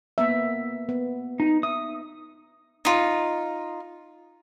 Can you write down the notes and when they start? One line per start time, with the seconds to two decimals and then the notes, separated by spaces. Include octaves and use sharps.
0.18 A#3 B3 E5
0.89 B3
1.40 D#4
1.63 E5 D#6
2.85 D#4 F4